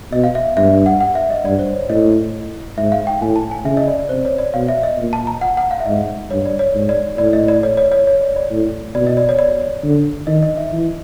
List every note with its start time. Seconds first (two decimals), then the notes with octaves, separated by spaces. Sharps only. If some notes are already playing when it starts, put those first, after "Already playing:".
0.12 B2 D#5
0.24 F5
0.35 E5
0.57 G2 E5
0.86 F#5
1.00 F#5
1.15 E5
1.30 D#5
1.45 G2 D5
1.59 C5
1.74 C#5
1.89 A2 D#5
2.77 G#2 E5
2.92 F5
3.07 G5
3.21 A2 G#5
3.36 A5
3.51 G#5
3.65 C#3 E5
3.77 D#5
3.87 D5
3.99 D5
4.09 C3 C5
4.25 C#5
4.38 D5
4.54 B2 F5
4.68 E5
4.83 D#5
4.98 A#2
5.13 A5
5.27 A#5
5.41 F#5
5.57 F#5
5.71 F5
5.80 E5
5.86 G#2 D#5
6.30 G2 C#5
6.46 D5
6.59 C#5
6.75 G#2
6.89 D5
7.18 A2 D5
7.33 D#5
7.48 D5
7.63 C#5
7.77 C#5
7.92 C#5
8.07 C#5
8.21 D5
8.36 D5
8.51 A2
8.95 B2 D5
9.07 D#5
9.17 D5
9.29 C#5
9.39 D5
9.84 D3
10.27 D#3 D#5
10.43 D#5
10.57 E5
10.72 E3